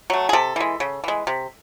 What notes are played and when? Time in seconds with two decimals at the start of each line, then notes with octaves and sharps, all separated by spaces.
0.10 F#3 A3
0.29 G#4
0.33 C3 A4
0.56 E3 G#3
0.80 C#3
1.04 E3 G#3
1.27 C3